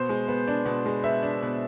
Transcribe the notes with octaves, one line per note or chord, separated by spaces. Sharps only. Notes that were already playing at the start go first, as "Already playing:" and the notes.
Already playing: B2 C5
G#3
B3
D4
B2
G#3
B3 E5
D4
B2